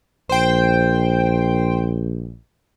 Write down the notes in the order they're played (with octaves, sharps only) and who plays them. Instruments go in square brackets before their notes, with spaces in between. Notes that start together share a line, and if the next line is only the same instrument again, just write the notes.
[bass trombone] A#1 [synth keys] C5 G5